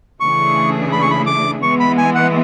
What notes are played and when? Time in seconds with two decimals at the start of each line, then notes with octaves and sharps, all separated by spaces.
0.20 C#3 E3 A3 D4 G#4 C#6
0.92 B5
1.01 C#6
1.11 B5
1.26 D6
1.62 E3 G#3 B3 C#6
1.80 B5
1.98 G#5
2.15 F#5